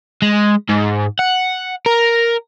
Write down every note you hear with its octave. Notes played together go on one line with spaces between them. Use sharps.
G#3
G#2
F#5
A#4